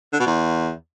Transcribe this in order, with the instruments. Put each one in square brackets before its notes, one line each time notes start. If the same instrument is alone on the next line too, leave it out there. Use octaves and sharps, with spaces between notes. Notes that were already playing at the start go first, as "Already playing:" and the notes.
[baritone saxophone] D3
B2
E2